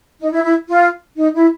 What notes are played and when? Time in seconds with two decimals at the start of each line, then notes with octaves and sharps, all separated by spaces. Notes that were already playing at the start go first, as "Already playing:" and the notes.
0.20 D#4
0.31 E4
0.44 E4
0.68 F4
1.17 D#4
1.34 E4